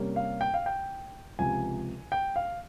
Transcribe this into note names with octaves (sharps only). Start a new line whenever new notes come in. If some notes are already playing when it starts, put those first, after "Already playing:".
Already playing: C3 G3 A#3 C#4
F5
G5
F5
G5
C#2 C3 F3 G#5
G5
F5